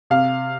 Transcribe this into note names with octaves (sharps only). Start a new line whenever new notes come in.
C3 F5